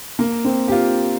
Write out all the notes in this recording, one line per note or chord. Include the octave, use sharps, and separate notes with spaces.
A#3
C4
G4
F4